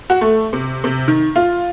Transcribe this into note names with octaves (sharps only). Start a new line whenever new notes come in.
F#4
A3
C3
C3
D#3
F4